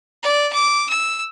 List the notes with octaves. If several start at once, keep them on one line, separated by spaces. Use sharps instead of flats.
D5
D6
E6